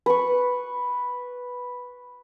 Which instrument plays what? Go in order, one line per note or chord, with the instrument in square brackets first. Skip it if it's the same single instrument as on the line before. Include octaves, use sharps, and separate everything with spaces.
[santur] B4 C#6